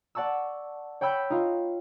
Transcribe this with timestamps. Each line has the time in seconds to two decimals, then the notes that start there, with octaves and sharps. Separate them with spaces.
0.15 D5 F#5 A5 C#6 E6
1.01 C#5 G5 B5 E6 F#6 G6
1.30 D#4 F4